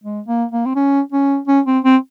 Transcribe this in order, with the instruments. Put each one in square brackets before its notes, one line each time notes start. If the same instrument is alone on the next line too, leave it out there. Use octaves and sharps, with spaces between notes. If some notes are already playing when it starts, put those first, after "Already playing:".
[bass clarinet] G#3
A#3
A#3
C4
C#4
C#4
C#4
C4
C4